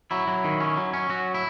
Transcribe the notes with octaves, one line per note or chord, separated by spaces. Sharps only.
F#3 E4
F#3
D#3
C#4
F#3
C#4
F#3 F#4
E4